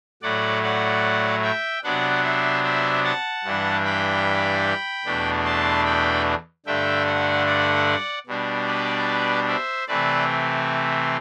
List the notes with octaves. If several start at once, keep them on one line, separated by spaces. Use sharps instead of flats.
A2 F#3 A3 D5 F#5
D5 F#5
E5 G5
C3 F#3 B3 D4 D5 F#5
C5 E5
C5 E5
F#5 A5
G2 E3 G3 D4
G5 B5
E2 B2 A3 D4
A5 C6
G5 B5
G2 D3 A3 D4 E5 G5
D5 F#5
D5 F#5
B2 G3 D4
B4 D5
C5 E5
C3 E3 A3 C4 B4 D5